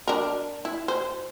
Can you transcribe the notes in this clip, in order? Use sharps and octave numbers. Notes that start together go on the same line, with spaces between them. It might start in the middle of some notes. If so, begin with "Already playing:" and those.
D4 A#4
E4
C5